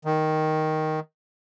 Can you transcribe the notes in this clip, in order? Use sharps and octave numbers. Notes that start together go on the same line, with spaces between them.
D#3